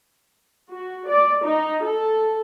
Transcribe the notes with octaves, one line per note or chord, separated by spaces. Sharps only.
F#4
D5
D#4
A4